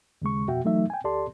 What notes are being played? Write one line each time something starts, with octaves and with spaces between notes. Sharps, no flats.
D#2 C#3 G#3 C#6
F2 B2 F#4 E5 G5
E3 F#3 A3 D#4 E5
G5 G#5
D2 G4 A4 D5 A5 C6